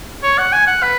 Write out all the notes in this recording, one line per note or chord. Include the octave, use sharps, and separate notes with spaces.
C#5
F#5
G#5
F#5
B4